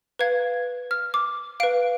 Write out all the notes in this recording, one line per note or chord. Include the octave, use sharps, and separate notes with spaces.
B4 F5 G#6
F6
D6
B4 F5 D7